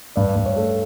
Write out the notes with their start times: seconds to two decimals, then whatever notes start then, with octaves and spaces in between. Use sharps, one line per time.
0.16 G2 D5
0.36 G2
0.46 C#5
0.56 A3